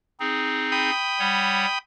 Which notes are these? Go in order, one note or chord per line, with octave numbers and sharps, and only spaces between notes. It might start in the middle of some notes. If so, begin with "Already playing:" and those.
C4 D#4 G#4
G5 B5 D#6
G3 C#5 F#5